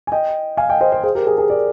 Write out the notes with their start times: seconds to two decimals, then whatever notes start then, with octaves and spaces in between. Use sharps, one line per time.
0.07 G#5
0.12 D#5 G5
0.57 F5 G#5
0.69 D#5 G5
0.81 C5 D#5
0.92 C5 D#5
1.03 G#4 C5
1.15 G4 A#4
1.27 G#4
1.38 G#4
1.50 A#4 D5